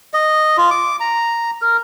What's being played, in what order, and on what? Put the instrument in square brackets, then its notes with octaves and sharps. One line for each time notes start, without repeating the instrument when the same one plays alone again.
[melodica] D#5
F4
D6
A#5
A#4